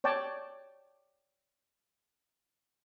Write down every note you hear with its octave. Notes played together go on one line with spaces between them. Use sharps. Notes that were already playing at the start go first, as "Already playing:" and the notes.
C#5 D5 G5 A5